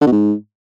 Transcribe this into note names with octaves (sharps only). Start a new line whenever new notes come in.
D3
B2
G#2